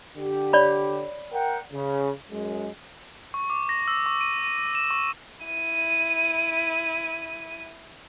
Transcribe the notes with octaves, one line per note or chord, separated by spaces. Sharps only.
D3 G4
C#5 D5 B5
A#4 F#5 G5
C#3
F#2 G#3
C#6
D6
A#6
E6
C#6
D#7
D#7
E7
C#6
E4 D#7